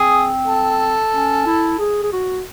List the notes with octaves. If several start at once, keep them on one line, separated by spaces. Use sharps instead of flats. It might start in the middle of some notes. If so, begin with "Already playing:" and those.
Already playing: C4 G#4
A4
C#4
E4
G#4
G#4
F#4